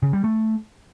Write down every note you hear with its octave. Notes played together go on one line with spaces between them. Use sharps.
C#3
G3
A3